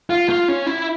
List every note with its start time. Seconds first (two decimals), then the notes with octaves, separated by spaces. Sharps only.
0.10 F4
0.30 F4
0.48 C#4
0.67 E4